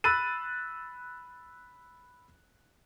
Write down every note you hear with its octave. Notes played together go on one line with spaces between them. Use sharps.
B5 E6 F#6 A6 D#7